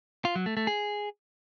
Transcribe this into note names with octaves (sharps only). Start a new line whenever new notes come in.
F4
F#3
A3
A3
G#4